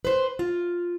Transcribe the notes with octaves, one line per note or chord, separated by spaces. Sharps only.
B4 C5
F4